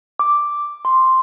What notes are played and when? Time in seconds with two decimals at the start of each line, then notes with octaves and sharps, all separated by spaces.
0.19 D6
0.85 C6